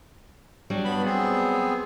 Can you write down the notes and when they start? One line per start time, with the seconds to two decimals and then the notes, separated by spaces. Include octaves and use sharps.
0.70 F#3 G3 D4
0.85 G2 B3 B5
1.05 B3 C4 G#4